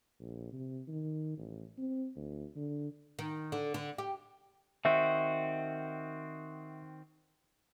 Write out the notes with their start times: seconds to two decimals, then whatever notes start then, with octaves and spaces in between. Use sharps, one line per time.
0.20 A#1
0.52 C3
0.88 D#3
1.38 A1
1.78 C4
2.16 D2
2.56 D3
3.19 D#3
3.52 D3
3.74 D3
3.98 G4
4.85 D#3 C4 F#4 E5